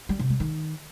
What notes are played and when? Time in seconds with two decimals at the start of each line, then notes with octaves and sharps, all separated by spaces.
0.09 G3
0.19 C3
0.30 G3
0.40 D#3